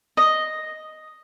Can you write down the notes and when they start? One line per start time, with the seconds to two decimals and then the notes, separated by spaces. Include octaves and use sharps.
0.17 D#5